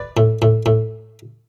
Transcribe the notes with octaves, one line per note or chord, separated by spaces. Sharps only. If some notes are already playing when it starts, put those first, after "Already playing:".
Already playing: B4 D5
A2
A2
A2